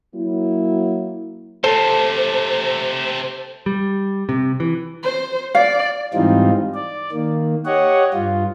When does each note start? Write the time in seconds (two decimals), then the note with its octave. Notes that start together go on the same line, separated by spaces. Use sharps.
0.15 F#3 A#3 E4
1.64 C3 A3 A4 C5
3.66 G3
4.29 C3
4.60 E3
5.03 C5
5.55 D5 F5
6.14 G#2 E3 G3 C4 D#4 F4
6.74 D5
7.12 D#3 A#3
7.66 G4 C#5 D#5 F#5
8.13 G2 F4